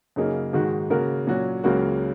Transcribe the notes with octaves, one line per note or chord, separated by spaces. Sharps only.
F#2 C#3 A#3 D#4 G#4
G#2 D#3 G#3 F#4
C#3 A#3 F#4 A#4
A#2 F#3 C#4 F#4
C#2 C#3 F#3 A#3 F#4